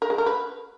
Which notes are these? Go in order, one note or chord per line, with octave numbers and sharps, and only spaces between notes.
A#4
G#3
A#4
B4